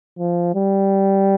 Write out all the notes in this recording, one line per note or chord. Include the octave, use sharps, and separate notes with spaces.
F3
G3